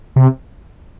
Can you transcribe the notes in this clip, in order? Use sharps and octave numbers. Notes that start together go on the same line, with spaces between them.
C3